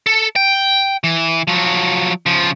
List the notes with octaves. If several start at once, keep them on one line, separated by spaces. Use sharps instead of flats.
A4
G5
E3
F3 F#3
C#3 F3